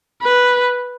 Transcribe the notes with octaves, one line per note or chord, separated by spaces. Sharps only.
B4